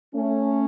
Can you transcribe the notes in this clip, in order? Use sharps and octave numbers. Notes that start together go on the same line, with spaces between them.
A3 C#4